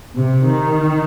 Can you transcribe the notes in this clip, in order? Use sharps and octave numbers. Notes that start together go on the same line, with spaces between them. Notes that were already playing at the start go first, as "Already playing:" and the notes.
C3
D#3